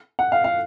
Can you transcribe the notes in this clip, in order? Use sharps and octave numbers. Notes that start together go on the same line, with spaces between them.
F#5
F5
F5